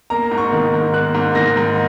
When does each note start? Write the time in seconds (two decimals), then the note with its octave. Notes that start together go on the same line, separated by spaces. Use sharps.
0.10 A#3 A#5
0.31 G#2
0.38 C#6
0.52 D#3
0.74 G#2
0.94 A#3 F#6
1.14 G#2
1.35 D#3 A#6
1.57 G#2